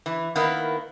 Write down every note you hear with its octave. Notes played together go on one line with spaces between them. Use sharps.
E3
D#3 A#3 B3 E4